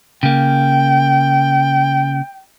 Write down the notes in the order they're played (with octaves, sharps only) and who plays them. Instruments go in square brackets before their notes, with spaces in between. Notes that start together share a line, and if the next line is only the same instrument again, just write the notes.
[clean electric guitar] C#3 A#3 [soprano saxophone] G5